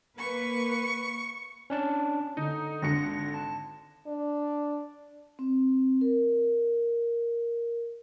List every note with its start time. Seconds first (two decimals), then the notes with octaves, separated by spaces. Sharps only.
0.18 A#3 B4 C#6
1.70 C#4 D4 A5
2.37 D3 D#4
2.82 G#1 D3 A#6 C#7
3.34 A5
4.07 D4
5.39 C4
6.01 A#4